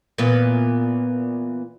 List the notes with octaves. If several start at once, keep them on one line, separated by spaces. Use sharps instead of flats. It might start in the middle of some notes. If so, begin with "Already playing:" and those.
A#2 E3 B3